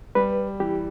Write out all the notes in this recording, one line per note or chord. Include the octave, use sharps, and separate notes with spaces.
G3 B4
E3 G4